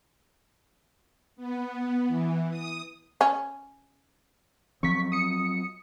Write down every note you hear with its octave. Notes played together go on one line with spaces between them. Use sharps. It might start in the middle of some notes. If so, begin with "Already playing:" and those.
B3
E3
D#6
C#4
F3 F#3 C4 C#6 B6
D#6 C#7